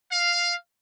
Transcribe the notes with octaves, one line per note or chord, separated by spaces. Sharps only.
F5